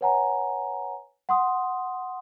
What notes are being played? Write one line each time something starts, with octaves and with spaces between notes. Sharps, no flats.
B4 C#5 F#5 G#5 A#5
F#5 C6 D#6